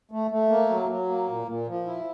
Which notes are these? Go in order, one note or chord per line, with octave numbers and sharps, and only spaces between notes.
A3
A3
A#3
F#3
F#3
A#3
A#2
A#2
F3
E4